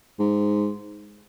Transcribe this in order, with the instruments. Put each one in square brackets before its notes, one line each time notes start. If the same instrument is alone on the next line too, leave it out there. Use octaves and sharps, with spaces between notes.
[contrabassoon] G#2